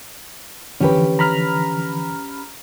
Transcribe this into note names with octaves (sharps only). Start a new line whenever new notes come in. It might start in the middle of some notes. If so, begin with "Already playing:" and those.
D3 E3 F3 C#4 G4 B4
A#5 B5 F6